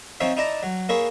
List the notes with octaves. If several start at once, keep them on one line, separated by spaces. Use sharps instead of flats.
F3 C4 D#4 C#5 E5
D#4 E4 D5 A5 A#5
F#3
A#3 E4 G#4 C#5 E5